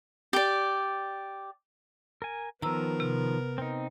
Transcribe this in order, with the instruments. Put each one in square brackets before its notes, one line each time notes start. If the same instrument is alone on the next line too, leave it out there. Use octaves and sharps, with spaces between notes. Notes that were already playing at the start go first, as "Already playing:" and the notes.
[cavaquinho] G4 D5
[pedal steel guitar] A#4 G#5
[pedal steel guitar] D#3 F3 [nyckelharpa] B3 A#4 [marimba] A#5 E6
[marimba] C3
[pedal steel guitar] C4 D#4